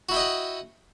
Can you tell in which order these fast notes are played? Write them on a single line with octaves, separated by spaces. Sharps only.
F#4 E4 G5 D#5 F#5